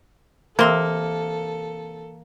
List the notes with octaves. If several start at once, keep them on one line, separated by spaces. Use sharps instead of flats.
C3 E3 A#3 A4 C6 E6